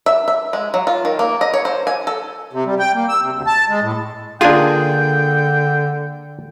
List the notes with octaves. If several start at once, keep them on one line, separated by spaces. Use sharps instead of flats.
E5
E5
G#3
F#3
F4
D#3
A#3
D#5
C#5
C5
G#5
A4
C3
G3
G5
A#3
E6
C3
D2
A5
G#3
A2
D3 A#3 D4 F4 G#4 G5